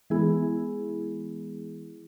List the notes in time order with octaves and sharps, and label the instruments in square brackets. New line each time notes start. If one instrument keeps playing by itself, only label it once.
[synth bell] E3 G#3 B3 E4 G#4